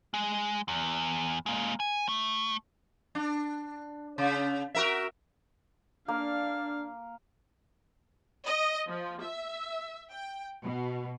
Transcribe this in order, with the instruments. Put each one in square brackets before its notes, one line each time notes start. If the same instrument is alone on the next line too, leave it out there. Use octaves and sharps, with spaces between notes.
[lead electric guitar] G#3
E2
G#3 A#3
G#5
A3
[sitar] D4
C#3
F#4 A#4 E5
[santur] A#3 [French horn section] D4 [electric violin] F5
[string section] D#5
F3
E5
G5
B2